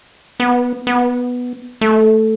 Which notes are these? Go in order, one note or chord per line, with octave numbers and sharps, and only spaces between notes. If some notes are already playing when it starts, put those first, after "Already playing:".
B3
B3
A3